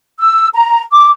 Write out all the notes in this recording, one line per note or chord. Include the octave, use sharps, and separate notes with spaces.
E6
A#5
D6